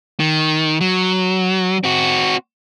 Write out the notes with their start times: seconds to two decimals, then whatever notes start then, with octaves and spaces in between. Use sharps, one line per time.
0.20 D#3
0.81 F#3
1.84 C4 F#4